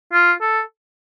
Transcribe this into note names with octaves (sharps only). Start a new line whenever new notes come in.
F4
A4